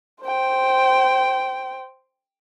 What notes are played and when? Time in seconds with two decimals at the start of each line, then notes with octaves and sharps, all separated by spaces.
0.22 C5 G5